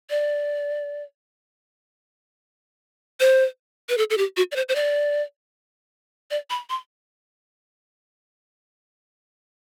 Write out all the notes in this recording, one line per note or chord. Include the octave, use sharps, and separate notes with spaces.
D5
C5
B4
A4
A4
G4
F#4
D5
C5
C5
D5
D5
B5
C6